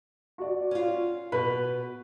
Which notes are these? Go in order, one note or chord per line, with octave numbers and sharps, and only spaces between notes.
F#4 D5
C#4 F4
B2 B4